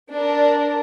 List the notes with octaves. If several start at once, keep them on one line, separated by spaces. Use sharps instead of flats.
D4 A#4